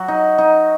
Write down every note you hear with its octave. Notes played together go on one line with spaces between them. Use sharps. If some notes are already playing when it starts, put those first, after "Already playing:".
Already playing: F#3 F#4
D#4
D#4